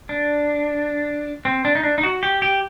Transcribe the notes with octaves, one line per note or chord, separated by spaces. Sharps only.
D4
C4
D4
D#4
D4
D#4
F#4
G4
G4